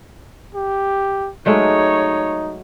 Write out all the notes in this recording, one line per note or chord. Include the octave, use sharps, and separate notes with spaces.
G4
F#3 G#3 A3 D#4 C#5